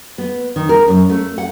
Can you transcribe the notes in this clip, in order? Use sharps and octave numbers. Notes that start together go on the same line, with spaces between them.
B3
D#3
A#4
F#2
A3
F#5